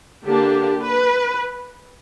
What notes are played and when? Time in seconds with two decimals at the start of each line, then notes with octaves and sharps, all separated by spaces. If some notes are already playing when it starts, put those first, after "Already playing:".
0.24 D3 A#3 D4 G4
0.83 B4